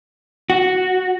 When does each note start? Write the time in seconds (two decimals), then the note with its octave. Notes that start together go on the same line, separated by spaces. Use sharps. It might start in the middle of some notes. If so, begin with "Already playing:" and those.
0.50 F#4